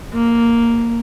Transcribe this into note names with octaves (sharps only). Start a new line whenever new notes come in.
A#3